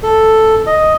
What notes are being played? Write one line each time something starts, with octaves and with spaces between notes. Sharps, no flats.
A4
D#5